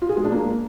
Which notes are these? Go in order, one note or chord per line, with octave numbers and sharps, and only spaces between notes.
F4
G#4
G#3
D4
A#3